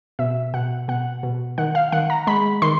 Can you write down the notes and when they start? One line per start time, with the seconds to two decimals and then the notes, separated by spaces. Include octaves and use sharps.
0.19 B2 E5
0.54 B2 F#5
0.88 B2 F#5
1.23 B2
1.58 D#3 F#5
1.75 F5
1.92 D#3 F#5
2.10 A#5
2.27 G#3 B5
2.62 D#3 C6